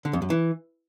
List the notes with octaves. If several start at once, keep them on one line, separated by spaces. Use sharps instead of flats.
D3
F2
F#2
E3